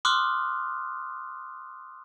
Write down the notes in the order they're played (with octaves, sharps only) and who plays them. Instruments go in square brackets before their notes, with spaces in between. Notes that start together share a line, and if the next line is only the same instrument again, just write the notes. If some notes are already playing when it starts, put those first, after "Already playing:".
[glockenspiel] C6 D6 D#6 F6 F#6